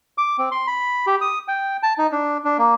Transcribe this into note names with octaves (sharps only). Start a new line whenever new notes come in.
D6
C4
C6
B5
G4
D#6
G5
A5
D#4
D4
D4
A#3